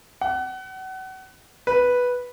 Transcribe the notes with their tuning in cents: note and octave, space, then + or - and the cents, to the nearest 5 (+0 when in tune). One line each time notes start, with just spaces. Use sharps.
F#5 +30
B4 -5